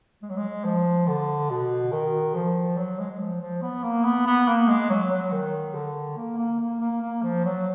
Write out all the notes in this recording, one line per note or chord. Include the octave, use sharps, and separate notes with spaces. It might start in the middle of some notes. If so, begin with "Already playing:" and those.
G#3
F#3
G#3
F3
D3
B2
D#3
F3
F#3
G#3
F3
F3
B3
A#3
B3
B3
A#3
G#3
F#3
F#3
D#3
D3
A#3
A#3
A#3
A#3
A#3
F3
F#3